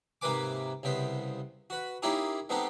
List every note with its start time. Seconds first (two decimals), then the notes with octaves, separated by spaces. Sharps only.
0.21 G#2 C3 A#3 B4 G#5 D6
0.83 C2 C#3 B3 C5
1.70 F#4 B4
2.02 A#3 C#4 D#4 E4 G4 G#4
2.49 G#3 B3 C4 D#4 G4 A4